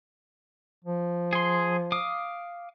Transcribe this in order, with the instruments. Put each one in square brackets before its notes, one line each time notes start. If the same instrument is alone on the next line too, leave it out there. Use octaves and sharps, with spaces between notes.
[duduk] F3
[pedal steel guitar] G#4 C6
F5 D6 D#6